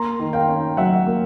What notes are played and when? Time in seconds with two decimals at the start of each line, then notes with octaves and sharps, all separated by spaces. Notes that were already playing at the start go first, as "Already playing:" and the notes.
Already playing: A#3 A#5 C6
0.20 D#3
0.33 F5 G5
0.48 C#4
0.77 F#3 E5 F#5
1.07 A#3